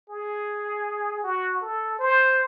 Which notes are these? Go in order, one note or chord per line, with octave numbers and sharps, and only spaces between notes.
G#4
F#4
A4
C5